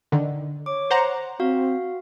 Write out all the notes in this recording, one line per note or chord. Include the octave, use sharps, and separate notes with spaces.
D3 D#3
C#5 D6
C5 F#5 A#5
C4 F#4 F5